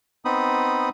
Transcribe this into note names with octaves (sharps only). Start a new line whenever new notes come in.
B3 C4 D#4 B5 D#6